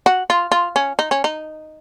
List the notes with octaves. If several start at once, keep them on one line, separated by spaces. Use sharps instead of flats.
F#4
F4
F4
C#4
D#4
C#4
D#4